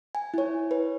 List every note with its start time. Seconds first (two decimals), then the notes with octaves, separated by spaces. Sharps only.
0.15 G#5
0.34 E4 C#5
0.71 B4